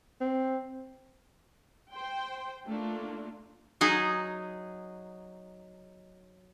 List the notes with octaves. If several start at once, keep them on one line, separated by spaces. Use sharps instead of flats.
C4
C5 G5
A3 A#3 D4 F4
F#3 D#4 G#4